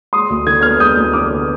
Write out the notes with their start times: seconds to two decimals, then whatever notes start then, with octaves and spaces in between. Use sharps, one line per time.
0.13 G#3 C6 D#6
0.30 D2
0.47 D3 G#6
0.61 B3 F6 G#6
0.80 G#3 D#6 G6
0.97 D2
1.13 D3 D6 F6
1.31 B3